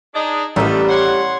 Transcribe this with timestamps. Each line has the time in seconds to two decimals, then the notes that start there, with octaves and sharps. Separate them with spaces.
0.14 D4 D#4 G#4
0.56 A1 D#3 G3 A3 B3 D4
0.88 C#5 F#5 C6